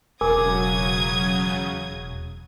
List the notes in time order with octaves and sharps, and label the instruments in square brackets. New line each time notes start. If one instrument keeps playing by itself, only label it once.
[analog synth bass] E1 [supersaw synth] C#3 F#3 [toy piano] A#4 G#5 D6 [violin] D#6 G#6